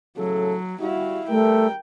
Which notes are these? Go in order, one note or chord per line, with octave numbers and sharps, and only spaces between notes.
A2 C#3 F#3 A4
G3 E4 F#4 F5
G#1 G3 A3 A#4 G5